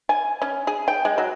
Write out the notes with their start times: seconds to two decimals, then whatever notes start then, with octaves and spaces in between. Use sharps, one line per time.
0.09 G#5
0.42 C#4
0.67 G#4
0.88 G5
1.05 G#3
1.18 F#3